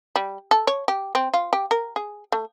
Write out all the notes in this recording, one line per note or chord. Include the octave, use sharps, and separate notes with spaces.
G3
A4
C#5
G4
C4
F4
G4
A#4
G#4
A3